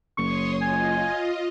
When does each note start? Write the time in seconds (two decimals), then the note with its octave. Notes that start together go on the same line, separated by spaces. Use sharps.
0.18 F#1 C#5 C6 C#6 D#6
0.62 F4 D#5 G#5